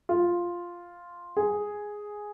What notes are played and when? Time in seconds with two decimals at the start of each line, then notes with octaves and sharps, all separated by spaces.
0.09 F4
1.37 G#4